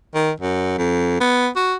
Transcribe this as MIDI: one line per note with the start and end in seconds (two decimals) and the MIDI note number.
0.14 0.31 51
0.40 0.75 42
0.78 1.18 41
1.20 1.49 59
1.56 1.74 66